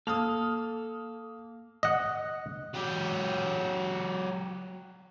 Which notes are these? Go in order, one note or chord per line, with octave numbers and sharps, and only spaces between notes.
A#3 A4 D#6 F6 F7
D#5 F#5
F#3 G4